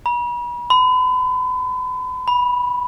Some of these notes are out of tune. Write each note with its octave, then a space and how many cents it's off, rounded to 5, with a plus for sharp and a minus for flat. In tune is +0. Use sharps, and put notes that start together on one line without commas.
B5 -40
B5 +40
B5 -10